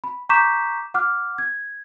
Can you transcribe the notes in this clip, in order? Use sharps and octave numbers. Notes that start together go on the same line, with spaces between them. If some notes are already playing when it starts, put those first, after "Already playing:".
B5
A#5 C#6 D6 G6 B6 E7
F#5 D6 F6 F#6
G#6